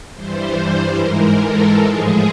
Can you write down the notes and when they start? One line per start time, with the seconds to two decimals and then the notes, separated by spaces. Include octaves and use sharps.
0.14 G2 E3 G3 C5
0.56 C5
0.98 G#2 E3 G#3 A#4
1.40 A4
1.81 A2 F3 G#3 G#4